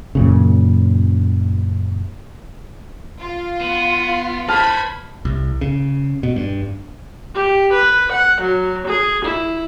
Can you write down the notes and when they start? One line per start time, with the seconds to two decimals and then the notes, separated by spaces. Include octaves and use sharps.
0.15 F#2 A#2 C#3
3.20 F4
3.61 B3
4.49 B4 C5 A5 B5 F6 G#6
5.25 C2
5.61 C#3
6.23 B2
6.36 G2
7.34 G4
7.73 B4
8.12 F#5
8.41 F#3
8.87 G#4
9.25 E4